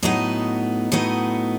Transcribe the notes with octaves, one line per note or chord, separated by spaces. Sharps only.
A2 F#3 B3 D#4 D#5
A2 F#3 B3 D#4 D#5